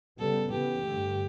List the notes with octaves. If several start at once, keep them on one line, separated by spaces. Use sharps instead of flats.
C#3 G3 B3 A4
C#3 E3 B3 G4
G2 D3 A3